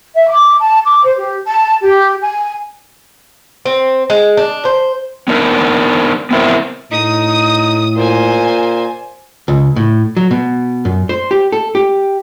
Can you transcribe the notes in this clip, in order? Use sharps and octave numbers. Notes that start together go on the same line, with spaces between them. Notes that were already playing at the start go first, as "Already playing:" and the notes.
E5
D6
A5
D6
C5
G4
A5
G4
G#5
C4
G#3
D4
C5
B3 D4 D#4 A#4
B3 C4 E4 A#4
A2 D#4 D#6
A#2 C5 G#5
C#2
A2
F#3
B2
F#2
C5
G4
A4
G4